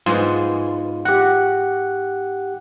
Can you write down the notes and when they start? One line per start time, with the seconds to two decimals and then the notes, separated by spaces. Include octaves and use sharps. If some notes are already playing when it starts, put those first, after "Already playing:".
0.06 G#2 G#3 B3 F4
1.05 F#4 G4 F#5